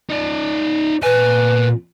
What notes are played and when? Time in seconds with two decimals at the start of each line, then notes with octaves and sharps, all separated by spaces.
0.09 D#4 D5
1.03 A#2 B4 G#5